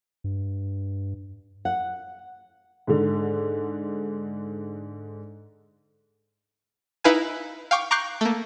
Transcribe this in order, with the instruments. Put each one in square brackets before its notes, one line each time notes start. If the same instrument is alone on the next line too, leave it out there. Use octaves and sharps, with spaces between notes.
[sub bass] G2
[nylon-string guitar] F#5
[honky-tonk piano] G#2 D3
[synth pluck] D#4 E4 B4 F5 G#5
F5 G5 C#6 D6
A#5 C#6 D6 F#6 G6 C7
A3 A#3